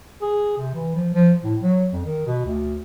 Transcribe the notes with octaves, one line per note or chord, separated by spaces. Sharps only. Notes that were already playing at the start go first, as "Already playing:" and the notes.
G#4
C3
E3
F3
F3
A2
F#3
F2
D#3
B2
D2